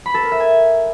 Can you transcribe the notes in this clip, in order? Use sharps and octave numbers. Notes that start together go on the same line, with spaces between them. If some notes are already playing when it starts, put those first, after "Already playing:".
B5
A4
A#4
E5
G#5